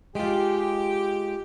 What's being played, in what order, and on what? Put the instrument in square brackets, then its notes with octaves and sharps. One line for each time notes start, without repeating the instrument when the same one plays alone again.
[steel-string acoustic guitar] G#3 F4 [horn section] G4